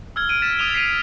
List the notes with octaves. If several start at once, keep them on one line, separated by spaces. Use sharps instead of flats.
E6 F6 G#6 G7
F6 D7 D#7
F6 A6 B6 E7
D#6 E6 D#7 F7 G7
B6 C7 D7 D#7 F7
D7